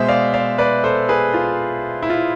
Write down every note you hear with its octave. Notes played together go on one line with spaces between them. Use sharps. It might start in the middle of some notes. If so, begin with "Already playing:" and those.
Already playing: B2 G#3 C5 E5
D5 F5
D5 F5
B4 D5
A4 C5
G#4 B4
F4
E4
F4